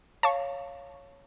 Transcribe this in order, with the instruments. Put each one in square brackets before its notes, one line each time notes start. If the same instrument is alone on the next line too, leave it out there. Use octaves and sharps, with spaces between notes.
[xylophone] C#5 F5 [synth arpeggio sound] A5 C#6